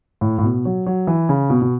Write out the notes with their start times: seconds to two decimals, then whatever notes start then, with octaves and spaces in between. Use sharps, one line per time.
0.21 A2
0.38 A2
0.43 B2
0.65 F#3
0.86 F#3
1.07 E3
1.29 C#3
1.50 B2
1.62 B2